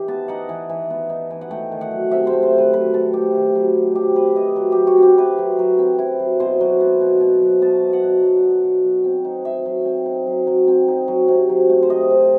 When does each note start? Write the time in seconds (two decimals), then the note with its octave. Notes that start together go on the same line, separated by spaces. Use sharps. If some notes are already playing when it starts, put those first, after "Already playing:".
Already playing: E3 D#4 G4
0.08 B3 A5
0.28 D#4 F#5
0.49 E3
0.70 E3
0.90 B3
1.10 D#4
1.31 E3
1.41 F#5
1.51 A3 G5
1.72 D#3
1.81 F#5
1.91 F#3
2.11 C3 E5
2.27 C5
2.33 A3
2.43 C5
2.53 D#3
2.58 B4
2.73 F#3 B4
2.94 C3 A4
3.13 A3 G4
3.34 D#3
3.55 F#3
3.75 C3
3.95 F#3 G4
4.16 C4 B4
4.36 E4 D#5
4.56 F#3
4.72 F#3 G4
4.87 F#4
4.98 C4 G4
5.18 E4 B4
5.38 F#3
5.59 F#3
5.79 C4
5.99 E4
6.19 F#3
6.40 B2 C5
6.61 F#3
6.81 B3
7.01 B2
7.21 B2
7.42 F#3
7.62 B3 A5
7.83 B2
7.93 F#5
8.03 B2
8.23 F#3
8.43 B3
8.64 B2
8.84 F#3
9.04 C4
9.25 D#4
9.45 F#3 E5
9.66 F#3
9.85 C4
10.06 D#4
10.27 F#3
10.47 F#3
10.68 C4
10.88 D#4
11.08 F#3
11.28 C3
11.49 F#3
11.69 A3
11.83 C5
11.90 C3 D#5
12.10 C3